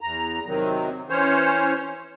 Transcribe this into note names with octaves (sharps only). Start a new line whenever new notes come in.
E2 A#5
C3 D#3 F#3
E3 C#4 C5 C#5